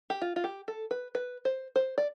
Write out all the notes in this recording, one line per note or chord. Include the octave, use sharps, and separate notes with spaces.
G4
F4
F4
G4
A4
B4
B4
C5
C5
D5